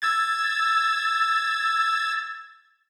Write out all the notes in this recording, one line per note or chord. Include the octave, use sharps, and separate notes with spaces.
E6 G#6 A6